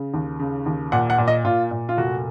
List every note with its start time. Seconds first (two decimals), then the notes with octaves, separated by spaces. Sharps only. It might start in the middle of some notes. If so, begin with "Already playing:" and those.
Already playing: C#3
0.14 D#2
0.39 C#3
0.66 D#2
0.92 A#2 F#5
1.10 F#5
1.18 A#2
1.28 D#5
1.44 A#2 F4
1.71 A#2
1.89 F4
1.98 F1 F#4